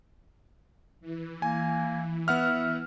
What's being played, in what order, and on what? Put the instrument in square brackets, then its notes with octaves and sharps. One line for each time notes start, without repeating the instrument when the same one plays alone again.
[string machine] E3
[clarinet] A#3 [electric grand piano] G#5
[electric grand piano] B3 F#5 F6 [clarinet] E5